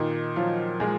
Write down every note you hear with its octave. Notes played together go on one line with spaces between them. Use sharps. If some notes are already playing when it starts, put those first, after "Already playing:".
Already playing: A#2 D#3 D#4
F3 F#3 F4
A#2 G#3 G#4